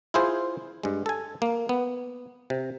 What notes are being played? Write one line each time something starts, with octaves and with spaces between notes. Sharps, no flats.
E4 F4 G#4 C5
G2 G#3
A4 G#5
A#3
B3
C3